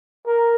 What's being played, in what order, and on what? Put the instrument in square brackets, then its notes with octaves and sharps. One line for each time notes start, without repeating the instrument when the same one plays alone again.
[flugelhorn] A#4